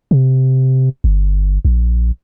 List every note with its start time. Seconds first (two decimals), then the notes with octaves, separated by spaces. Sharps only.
0.11 C3
1.04 G1
1.65 A#1